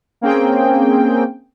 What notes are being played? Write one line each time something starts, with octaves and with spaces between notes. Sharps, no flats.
A#3 C4 C#4 G#4 G5